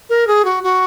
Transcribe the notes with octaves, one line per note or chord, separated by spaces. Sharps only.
A#4
G#4
F#4
F#4